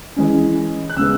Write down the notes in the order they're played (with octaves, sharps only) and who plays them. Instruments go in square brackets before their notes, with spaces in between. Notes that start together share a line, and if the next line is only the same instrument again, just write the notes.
[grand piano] E3 G#3 C#4
F#6
C#3 G#3 B3 E6